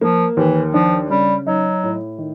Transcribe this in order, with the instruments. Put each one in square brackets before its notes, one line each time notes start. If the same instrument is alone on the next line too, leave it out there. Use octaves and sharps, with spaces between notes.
[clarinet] F3 [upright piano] A#3
[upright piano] D#2 [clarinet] E3
[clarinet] F3 [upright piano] D4
[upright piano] C#3 [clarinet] G3
[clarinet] F#3 [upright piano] D#4
[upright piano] A2
D#3